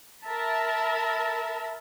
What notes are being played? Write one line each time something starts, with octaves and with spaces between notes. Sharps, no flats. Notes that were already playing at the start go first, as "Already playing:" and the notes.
A#4 E5 A5 B5